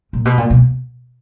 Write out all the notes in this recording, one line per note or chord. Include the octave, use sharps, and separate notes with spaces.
A#2
B2
A#2
B2